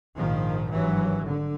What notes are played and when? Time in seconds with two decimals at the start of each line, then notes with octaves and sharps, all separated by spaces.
0.17 A#1 G#2 D#3 F3
0.72 G#1 G2 E3 F#3
1.27 D3